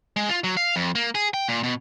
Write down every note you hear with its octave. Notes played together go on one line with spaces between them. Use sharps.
G#3
F4
F#3
F5
F2
A#3
G#4
G5
A#2
B2